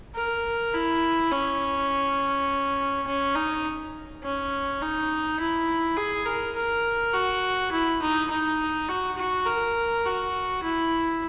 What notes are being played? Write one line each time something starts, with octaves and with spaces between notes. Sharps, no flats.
A#4
E4
C#4
C#4
D#4
C#4
D#4
E4
G#4
A#4
A#4
F#4
E4
D#4
D#4
F#4
F#4
A#4
F#4
E4